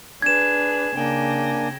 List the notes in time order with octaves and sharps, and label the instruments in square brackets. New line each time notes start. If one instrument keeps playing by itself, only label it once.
[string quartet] D4 G#4 B4 [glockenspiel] G#6 E7
[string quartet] C#3 G5 A#6 [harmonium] A#3 D4 G#5